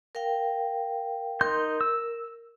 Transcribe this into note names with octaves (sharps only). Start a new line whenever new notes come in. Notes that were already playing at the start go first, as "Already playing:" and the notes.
A#4 F5 G5
D#4 A#4 C6 G6
E6